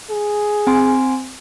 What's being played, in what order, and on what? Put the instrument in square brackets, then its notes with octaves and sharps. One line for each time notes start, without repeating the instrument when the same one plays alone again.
[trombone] G#4
[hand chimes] C4 G#5 C6